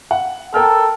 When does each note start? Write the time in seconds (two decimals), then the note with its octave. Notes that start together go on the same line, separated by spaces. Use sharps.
0.11 F#5
0.54 A4 A#4 G5 F6